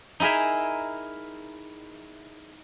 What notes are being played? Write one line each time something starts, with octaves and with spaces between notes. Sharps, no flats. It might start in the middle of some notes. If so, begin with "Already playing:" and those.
D#4 E4 G#4 A#4 E5